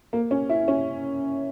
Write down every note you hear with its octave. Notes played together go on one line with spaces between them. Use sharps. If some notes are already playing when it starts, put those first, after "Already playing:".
A#3
C#4
E4
C#4